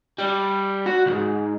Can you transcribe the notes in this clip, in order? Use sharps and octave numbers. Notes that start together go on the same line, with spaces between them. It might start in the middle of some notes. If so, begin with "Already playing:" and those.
G3
F#4
C#2 G#2